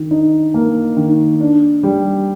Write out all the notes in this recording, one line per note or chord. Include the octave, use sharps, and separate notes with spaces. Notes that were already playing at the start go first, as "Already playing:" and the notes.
Already playing: D#3
D#4
A#3
D#3
D4
G3